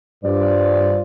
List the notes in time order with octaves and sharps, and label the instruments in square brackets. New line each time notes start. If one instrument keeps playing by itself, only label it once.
[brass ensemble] G2 [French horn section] F4 C5 D5